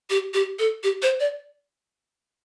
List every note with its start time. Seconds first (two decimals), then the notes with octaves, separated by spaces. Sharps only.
0.10 G4
0.34 G4
0.59 A4
0.83 G4
1.02 C5
1.20 D5